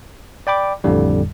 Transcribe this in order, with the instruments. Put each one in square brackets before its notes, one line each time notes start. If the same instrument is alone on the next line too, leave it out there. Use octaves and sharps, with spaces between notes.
[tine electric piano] D5 G5 B5 D6
A1 F2 A2 D3 G3